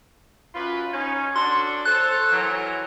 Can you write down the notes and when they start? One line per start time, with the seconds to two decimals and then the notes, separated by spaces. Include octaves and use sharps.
0.55 F#2 F4 B4
0.92 C#4 D#4
1.36 D4 F#4 A4 C6
1.85 A4 C5 C#5 F#6
2.31 E3 F#3 A#4